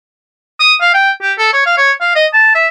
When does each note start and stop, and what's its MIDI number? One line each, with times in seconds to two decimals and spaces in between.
0.60 0.74 87
0.81 0.91 77
0.94 1.11 79
1.22 1.33 67
1.38 1.53 69
1.53 1.61 73
1.66 1.75 77
1.78 1.92 73
2.01 2.13 77
2.15 2.26 75
2.33 2.54 81
2.55 2.68 76